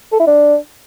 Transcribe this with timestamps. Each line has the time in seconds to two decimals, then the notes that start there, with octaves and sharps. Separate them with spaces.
0.12 A4
0.19 E4
0.27 D4